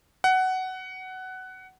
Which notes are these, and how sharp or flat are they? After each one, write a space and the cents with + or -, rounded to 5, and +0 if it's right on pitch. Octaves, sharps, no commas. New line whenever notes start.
F#5 +15